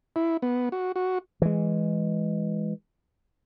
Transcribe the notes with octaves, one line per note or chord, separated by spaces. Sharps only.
E4
B3
F#4
F#4
E3 G#3